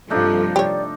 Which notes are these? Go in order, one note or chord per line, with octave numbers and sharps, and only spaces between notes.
G2 C3 F3 A3 D4 D#4 A4
G4 C#5 D5